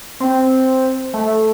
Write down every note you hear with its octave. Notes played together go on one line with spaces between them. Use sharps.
C4
A3